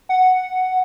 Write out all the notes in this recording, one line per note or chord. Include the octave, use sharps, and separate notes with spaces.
F#5